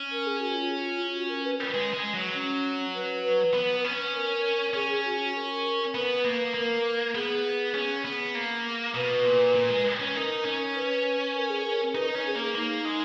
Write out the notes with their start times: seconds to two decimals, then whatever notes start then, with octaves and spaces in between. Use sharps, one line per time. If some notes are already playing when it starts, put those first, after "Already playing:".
Already playing: C#4
0.11 A#4
0.26 G#4
0.40 F#4
0.54 F4
1.14 F#4
1.28 A#4
1.44 B4
1.59 B4
1.74 G#3
1.94 G#3
2.14 F#3
2.34 C#4
2.94 B4
3.54 B3
3.84 C#4
4.14 A#4
4.74 C#4 G#4
4.89 G#4
5.04 F#4
5.19 F#4
5.34 A#4
5.94 B3 B4
6.25 A#3
6.54 A#3 A#4
7.15 B3 G#4
7.75 C#4
8.05 B3
8.35 A#3
8.95 B2 B4
9.25 A#2
9.55 A#2
9.69 G#3
10.00 C#4
10.15 D#4 A#4
10.45 C#4
10.74 B4
11.35 A#4
11.49 G#4
11.63 A#4
11.95 D#4 B4
12.10 C#4 A#4
12.25 G#4
12.35 A#3
12.55 A#3 D#4
12.85 G#3